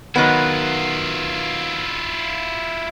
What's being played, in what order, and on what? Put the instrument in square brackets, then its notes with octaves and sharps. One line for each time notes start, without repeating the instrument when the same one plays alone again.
[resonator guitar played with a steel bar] D#3 F#3 B3 [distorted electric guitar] E4 F4